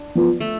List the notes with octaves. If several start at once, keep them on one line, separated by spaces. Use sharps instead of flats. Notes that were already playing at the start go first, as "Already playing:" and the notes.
Already playing: D4
F3 B3 F4
A3